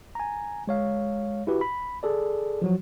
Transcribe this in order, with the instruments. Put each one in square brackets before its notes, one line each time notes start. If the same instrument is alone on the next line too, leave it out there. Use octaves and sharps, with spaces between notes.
[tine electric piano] G#5 A#5
G#3 C#5 F5
E4 F#4 G4 B4
B5
G#4 A4 D5
F3 F#3 F#4